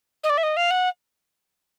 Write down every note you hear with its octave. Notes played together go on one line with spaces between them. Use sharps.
D#5
D5
E5
D#5
F5
F#5